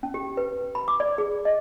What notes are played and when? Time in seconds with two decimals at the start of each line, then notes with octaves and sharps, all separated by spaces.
0.03 C#4
0.14 G4
0.37 B4
0.75 B5
0.88 D6
1.00 D5
1.18 G#4
1.45 D#5